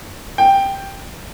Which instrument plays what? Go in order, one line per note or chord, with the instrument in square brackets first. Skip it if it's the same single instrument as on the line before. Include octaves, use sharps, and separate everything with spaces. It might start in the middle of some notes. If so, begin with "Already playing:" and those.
[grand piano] G5